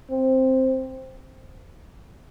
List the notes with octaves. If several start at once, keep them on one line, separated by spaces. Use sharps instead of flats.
C4